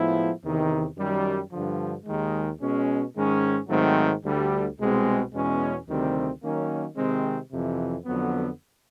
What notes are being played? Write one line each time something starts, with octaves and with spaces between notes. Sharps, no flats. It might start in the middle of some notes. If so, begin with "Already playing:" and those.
Already playing: A2 F3 G#3 B3 E4
E2 C3 D#3
F#2 D#3 G3
G2 D3 F3
D#2 D#3 G#3
B2 G#3 C#4
G#2 D#3 G#3 C#4
G#2 D#3 F#3 A3 C4
D2 D3 G3
C2 B2 G#3 C4
E2 B2 G#3 C#4
D2 C3 D#3 G3 C4
D#3 F#3 A#3 C#4
C3 D#3 G#3 C4
F2 C3 E3
F2 D3 F#3 B3